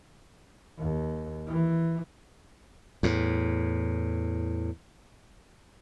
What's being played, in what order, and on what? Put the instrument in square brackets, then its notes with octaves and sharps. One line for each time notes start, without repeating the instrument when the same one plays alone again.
[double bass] D#2
E3
[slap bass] E2 A2